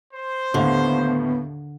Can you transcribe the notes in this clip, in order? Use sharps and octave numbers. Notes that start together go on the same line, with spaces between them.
C5
D#2 A2 D3 B3 F5